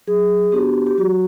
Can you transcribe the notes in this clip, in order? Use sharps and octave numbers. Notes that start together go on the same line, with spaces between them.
F#3 G#4
B3 D4 F#4 G4
G4
F#3 F#4